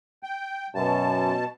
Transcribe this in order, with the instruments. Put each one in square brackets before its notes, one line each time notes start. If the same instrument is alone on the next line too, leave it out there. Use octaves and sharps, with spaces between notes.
[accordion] G5
[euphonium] F#2 [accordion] B2 A5